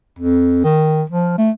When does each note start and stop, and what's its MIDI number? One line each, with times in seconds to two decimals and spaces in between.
0.19 0.60 41
0.64 1.03 51
1.09 1.35 53
1.38 1.50 57